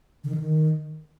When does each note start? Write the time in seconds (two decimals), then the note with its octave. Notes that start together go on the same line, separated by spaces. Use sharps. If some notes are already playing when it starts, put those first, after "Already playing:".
0.24 D3
0.29 D#3
0.35 D3
0.40 D#3